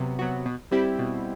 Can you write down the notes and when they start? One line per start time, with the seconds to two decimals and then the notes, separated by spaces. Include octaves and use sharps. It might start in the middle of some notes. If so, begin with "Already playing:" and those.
Already playing: C3 F#3 B3
0.19 F#3 B3 F#4
0.45 B2
0.71 G3 C4 E4 G4
0.99 B2